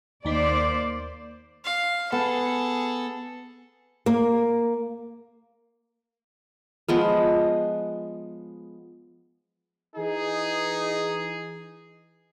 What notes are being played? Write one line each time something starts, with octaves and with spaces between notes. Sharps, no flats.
D#2 A#3 D#4 C5 D5 B6
F5
B3 G#4 A4
A#3
F3 G#3 B3
E3 D#4 G#4